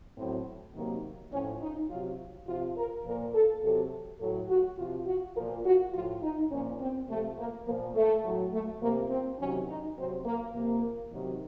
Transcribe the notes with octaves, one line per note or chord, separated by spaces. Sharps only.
A2 F#3 C4
C3 D#3 F#3 A#3
A2 F3 C#4
D#4
C3 F#3 F4
C3 F3 F4
A#4
A#2 F3 A#4
A4
C3 F#3 A4
A2 F#3 A4
F#4
C3 F3 F4
F#4
A#2 F3 A#4
F#4
A2 F3 F4
D#4
A#2 F3 C#4
C4
C3 F3 A3
A#3
A#2 F3 A#3
A3
A2 F#3
A3
C3 F3 A#3
C4
C3 D#3 F#3 C#4
D#4
C3 F#3 C4
A#3
C3 F3 A#3
C3 D#3 F#3